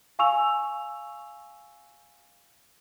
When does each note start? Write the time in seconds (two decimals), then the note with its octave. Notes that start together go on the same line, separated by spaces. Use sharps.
0.19 F5 G#5 C#6 E6 F7